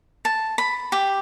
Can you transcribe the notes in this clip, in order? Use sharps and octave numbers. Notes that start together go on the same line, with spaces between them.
A5
B5
G4